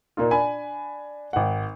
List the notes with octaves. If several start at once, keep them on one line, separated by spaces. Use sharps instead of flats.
A#2 A#3 D#4 F4
D4 G#5 B5
G#1 F#5